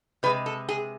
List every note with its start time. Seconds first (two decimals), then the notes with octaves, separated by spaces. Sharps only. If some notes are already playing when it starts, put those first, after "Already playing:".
0.23 C3 G#3 B4
0.46 A4
0.69 G#4